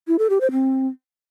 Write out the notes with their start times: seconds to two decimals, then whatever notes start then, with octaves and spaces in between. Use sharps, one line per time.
0.08 E4
0.19 A4
0.30 G4
0.41 C5
0.52 C4